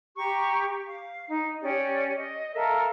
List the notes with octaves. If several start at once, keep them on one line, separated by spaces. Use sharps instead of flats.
G4 A#5 C#6
F5
D#4
C#4 G4 D5
D#5
A4 A#4 E5 F5